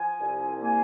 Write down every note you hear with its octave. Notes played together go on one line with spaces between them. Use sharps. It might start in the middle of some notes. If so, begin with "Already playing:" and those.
Already playing: F3 G#5
C2
A#3 G#5